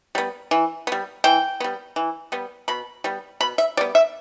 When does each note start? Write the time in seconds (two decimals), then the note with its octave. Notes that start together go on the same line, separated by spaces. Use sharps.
0.15 G3 B3
0.51 E3
0.87 G3 B3
1.24 E3 G5
1.60 G3 B3
1.96 E3
2.32 G3 B3
2.68 B2 B5
3.04 G3 B3
3.40 B2 B5
3.58 E5
3.77 G3 D5
3.81 B3
3.95 E5